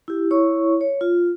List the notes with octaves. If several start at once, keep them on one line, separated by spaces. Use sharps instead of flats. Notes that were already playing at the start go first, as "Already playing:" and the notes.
E4 G4
E4 C#5 C#6
C#5
F4